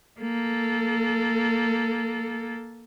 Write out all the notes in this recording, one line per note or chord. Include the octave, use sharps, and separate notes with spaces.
A#3 A4